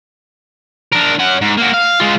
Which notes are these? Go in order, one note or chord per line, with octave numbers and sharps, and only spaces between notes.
D4 A#4
C#4 F#5
G#2
A#3 F#4
F5
G#3 F4